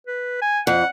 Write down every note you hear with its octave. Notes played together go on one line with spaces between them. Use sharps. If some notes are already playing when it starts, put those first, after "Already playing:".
B4
G#5
F2 F#5